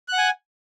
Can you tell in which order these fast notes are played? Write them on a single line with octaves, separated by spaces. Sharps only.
F#6 F#5 G#5